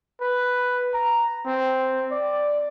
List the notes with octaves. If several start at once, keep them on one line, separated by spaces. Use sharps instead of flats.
B4
A#5
C4
D5